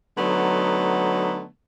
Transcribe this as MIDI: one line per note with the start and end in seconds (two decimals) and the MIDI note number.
0.17 1.46 50
0.17 1.46 54
0.17 1.46 57
0.17 1.46 59
0.17 1.46 63